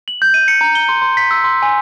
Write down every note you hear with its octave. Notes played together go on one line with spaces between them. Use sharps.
F#7
G6
D#7
C#7
A#5
G7
C6
C6
B6
E6
C6
G#5